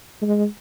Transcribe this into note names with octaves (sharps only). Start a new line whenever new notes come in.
G#3